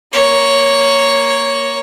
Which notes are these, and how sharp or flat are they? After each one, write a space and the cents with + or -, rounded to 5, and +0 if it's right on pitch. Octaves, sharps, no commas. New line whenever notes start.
A#3 +0 C#5 +0